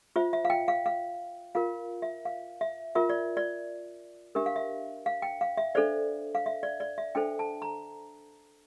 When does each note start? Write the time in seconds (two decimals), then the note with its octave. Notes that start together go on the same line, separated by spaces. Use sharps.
0.16 F4 C5 E5
0.33 E5
0.45 F5
0.50 G5
0.68 F5
0.86 F5
1.55 F4 A#4 F5
2.02 E5
2.25 F5
2.61 E5
2.95 F4 A#4 E5
3.10 D5
3.37 D5
4.35 D4 G4 A#4 E5
4.46 F5
4.56 E5
5.06 F5
5.22 G5
5.41 F5
5.57 E5
5.75 D4 A4 C5 D5
6.35 F5
6.46 E5
6.63 D5
6.80 D5
6.98 E5
7.15 D4 A4 C5 G5
7.39 A5
7.62 A#5